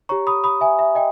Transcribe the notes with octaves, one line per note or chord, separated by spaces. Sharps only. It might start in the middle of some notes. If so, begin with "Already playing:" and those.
G4 C#5 A#5 C#6
B5 D#6
B5 D#6
E5 G#5
E5
D#5 G5